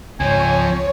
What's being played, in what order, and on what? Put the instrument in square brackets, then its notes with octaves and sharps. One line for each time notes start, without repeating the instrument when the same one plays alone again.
[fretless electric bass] C#2 G#2 [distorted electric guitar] F3 C4 [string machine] C#5 [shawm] G#5